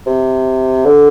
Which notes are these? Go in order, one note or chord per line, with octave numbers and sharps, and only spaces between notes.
C3
D3